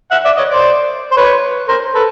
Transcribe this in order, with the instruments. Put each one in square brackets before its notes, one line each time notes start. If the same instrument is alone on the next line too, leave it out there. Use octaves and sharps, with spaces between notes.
[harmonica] E5 F#5
D5 E5
C#5 D#5
C5 D5
C5
B4 C#5
A#4 C5
A4 B4